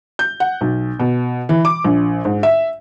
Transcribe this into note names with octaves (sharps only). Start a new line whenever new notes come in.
G6
F#5
B1
B2
E3
D6
A#1
G#2
E5